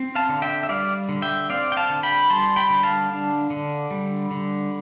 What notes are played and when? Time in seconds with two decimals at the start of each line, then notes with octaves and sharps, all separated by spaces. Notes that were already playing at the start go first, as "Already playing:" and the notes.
Already playing: C4
0.15 F5 A5
0.29 D3
0.42 E5 G5
0.63 E5
0.69 G3 D5 F5
1.09 D3
1.22 E5 G5
1.50 C4 D5 F5
1.72 G5
1.77 F5 A5
1.90 D3
2.03 G5 B5
2.30 G3 A5 C6
2.56 G5 B5
2.70 D3
2.83 F5 A5
3.10 D4
3.50 D3
3.91 G3
4.31 D3